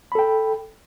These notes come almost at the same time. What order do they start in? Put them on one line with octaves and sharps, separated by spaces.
B5 A4 G5